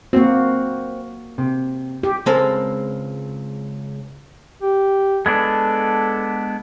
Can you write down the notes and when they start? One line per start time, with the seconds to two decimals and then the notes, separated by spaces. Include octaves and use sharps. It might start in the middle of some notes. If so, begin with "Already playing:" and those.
0.13 A#3 C4 F#4
1.38 C3
2.03 G4
2.26 C#2 G#3 C4 A4 A#4
4.62 G4
5.26 G#3 B3 D4 A4